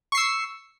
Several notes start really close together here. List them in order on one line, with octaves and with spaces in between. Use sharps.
C#6 C7 E6